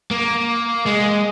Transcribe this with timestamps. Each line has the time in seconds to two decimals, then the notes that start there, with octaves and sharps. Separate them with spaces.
0.11 A#3
0.86 G#3